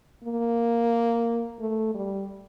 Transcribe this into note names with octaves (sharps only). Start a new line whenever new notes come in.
A#3
A3
G3